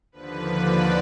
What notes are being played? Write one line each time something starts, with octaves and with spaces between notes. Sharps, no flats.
D#2 D3 F3 B4
D5